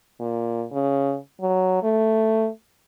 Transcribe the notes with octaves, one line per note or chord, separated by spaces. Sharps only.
A#2
C#3
F#3
A3